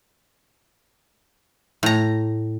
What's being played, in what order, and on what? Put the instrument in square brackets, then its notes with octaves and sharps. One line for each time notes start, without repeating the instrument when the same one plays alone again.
[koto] A2 A#5